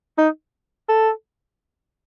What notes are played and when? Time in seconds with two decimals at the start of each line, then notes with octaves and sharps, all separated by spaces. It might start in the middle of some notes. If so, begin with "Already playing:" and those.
0.18 D#4
0.89 A4